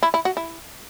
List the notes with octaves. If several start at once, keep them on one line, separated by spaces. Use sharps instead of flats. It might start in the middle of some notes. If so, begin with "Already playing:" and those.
E4
E4
F#4
E4